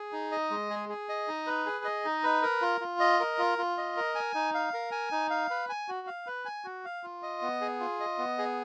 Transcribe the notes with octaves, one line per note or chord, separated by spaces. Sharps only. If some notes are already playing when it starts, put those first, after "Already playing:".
Already playing: G#4
D#4
D#5
G#3
G#4
G#4
D#5
D#4
B4
G#4
D#5
D#4
B4
A#4
F4
F4
D#5
A#4
F4
F4
D#5
A#4
G#5
D#4
F5
A#4
G#5
D#4
F5
B4
G#5
F#4
F5
B4
G#5
F#4
F5
F4
D#5
B3
G#4
F4
D#5
B3
G#4